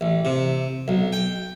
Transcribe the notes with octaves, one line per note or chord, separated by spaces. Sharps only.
A1
C3
B1
G5